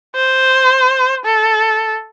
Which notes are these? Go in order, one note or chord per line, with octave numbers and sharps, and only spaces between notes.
C5
A4